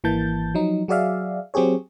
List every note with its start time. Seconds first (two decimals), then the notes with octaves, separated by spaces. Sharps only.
0.04 G#1 E3 A#3 A5 G6 A6
0.54 F3 F#3 D#4
0.88 F#3 F#4 G#4 D5 E5 F5
1.54 F#3 C4 G4 G#4 C#5